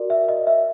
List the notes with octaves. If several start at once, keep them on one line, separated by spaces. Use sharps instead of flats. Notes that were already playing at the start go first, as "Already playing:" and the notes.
Already playing: F#4 A#4 D5
E5
D#5
E5